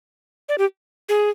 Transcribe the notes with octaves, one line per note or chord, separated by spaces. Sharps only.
D5
G4
G#4